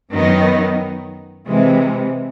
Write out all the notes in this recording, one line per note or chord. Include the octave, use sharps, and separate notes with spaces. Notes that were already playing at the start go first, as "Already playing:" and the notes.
F#2 D#3 F#3 B3 D#4
C3 E3 G#3